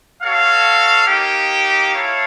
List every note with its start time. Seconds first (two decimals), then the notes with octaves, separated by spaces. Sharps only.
0.22 F#4 A4 C#5 F5
1.08 A#3 D#4 G4
1.93 E4 A4 C#5 F5